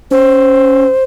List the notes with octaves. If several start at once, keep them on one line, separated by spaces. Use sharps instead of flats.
C#4 C5